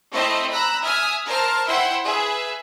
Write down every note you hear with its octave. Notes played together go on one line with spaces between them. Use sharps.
A3 C4 E4 C5 D#5 E5
A#5 B5 E6 F#6
E5 G#5 D#6 F6
A#4 C5 A5 F6
E4 C5 E5 F#5 G5 C6
G#4 B4 E5